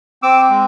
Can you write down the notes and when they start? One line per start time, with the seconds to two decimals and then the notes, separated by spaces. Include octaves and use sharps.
0.23 C4 D6 E6
0.50 G#3